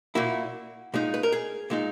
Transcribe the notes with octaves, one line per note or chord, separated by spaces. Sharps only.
A#2 A#3 E4 F#4
A#2 G#3 D#4
B4
A#4
G#4
A#2 G#3 D#4